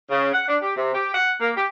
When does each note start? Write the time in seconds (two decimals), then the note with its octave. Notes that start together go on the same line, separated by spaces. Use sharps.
0.10 C#3
0.34 F#5
0.48 D4
0.63 G4
0.77 C3
0.95 G4
1.15 F#5
1.41 A#3
1.56 G4